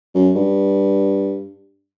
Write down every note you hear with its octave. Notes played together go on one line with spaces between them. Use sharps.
F#2
G2